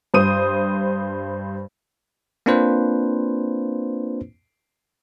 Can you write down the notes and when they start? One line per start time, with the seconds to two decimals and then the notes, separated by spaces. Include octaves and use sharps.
0.14 G2 C5 D#6 D#7
2.46 A#3 C4 D4 F4 B4 C5